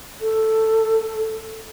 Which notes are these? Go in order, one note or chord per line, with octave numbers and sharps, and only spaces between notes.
A4